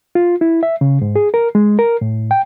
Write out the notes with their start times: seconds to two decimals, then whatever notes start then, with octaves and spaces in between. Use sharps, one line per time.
0.15 F4
0.41 E4
0.63 E5
0.81 C#3
1.01 G#2
1.16 G#4
1.34 A#4
1.55 G#3
1.79 A#4
2.01 A2
2.31 G5